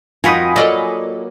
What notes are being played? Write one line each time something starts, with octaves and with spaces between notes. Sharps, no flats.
F2 D#4 F4 F#4 A#4 G#5 B5 D#6
F#3 A#3 A4 D5 D#5